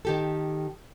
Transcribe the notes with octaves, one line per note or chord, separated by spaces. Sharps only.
D#3 G4 A4